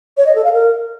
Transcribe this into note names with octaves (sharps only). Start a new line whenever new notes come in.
C#5
D#5
A4
F5
A#4